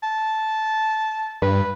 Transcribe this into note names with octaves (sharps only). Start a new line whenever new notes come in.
A5
G2 B4